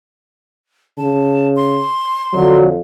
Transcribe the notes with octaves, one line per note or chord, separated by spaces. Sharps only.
C#3 A5
C6
F2 D3 F#3